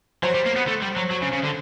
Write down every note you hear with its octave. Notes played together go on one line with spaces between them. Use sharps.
F#3 C5
G3
A#3
B3
A3
G3
F#3
F#3
C#3
C#3
D3